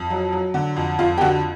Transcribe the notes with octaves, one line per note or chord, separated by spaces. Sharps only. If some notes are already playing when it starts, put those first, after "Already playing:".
Already playing: F2
F#3
F#3
D3
F2
F2 F4
G4
D3 F#4